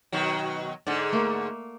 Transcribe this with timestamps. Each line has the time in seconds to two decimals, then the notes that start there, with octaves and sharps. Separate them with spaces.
0.12 B2 D#3 F#3
0.87 G#2 D3 D5 F#5
1.12 A3 A#3